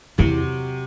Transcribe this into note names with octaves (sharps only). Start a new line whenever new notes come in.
E2 C3 F#3 C4